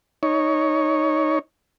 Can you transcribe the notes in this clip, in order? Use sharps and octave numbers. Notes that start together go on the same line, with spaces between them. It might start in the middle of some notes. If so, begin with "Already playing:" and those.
D#4 C#5